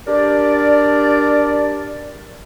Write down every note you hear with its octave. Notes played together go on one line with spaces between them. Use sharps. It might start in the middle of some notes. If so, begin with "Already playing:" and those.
D4 G4 A#4 D5